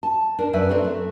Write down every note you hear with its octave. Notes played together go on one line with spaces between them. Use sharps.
A5
D4 A#4 A5
F#2 F#3 B4 D5 E5
C4 D4 A4 C#5
A3